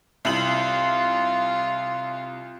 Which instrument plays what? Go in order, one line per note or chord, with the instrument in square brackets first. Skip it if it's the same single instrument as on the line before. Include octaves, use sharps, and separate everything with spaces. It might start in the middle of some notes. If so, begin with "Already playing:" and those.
[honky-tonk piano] C2 F#7 [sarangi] F4